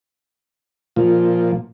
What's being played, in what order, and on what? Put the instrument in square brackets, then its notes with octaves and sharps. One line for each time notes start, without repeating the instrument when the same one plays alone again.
[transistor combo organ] A#2 F3